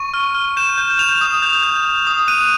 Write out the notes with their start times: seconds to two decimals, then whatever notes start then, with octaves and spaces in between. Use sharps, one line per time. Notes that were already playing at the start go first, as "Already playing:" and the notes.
Already playing: C#6 D#7
0.14 F6
0.35 F6
0.57 G6 E7
0.78 G6
0.99 G6 F7
1.21 D#6
1.42 G6
1.63 G6
1.85 G6
2.07 D#6
2.27 F#6 D#7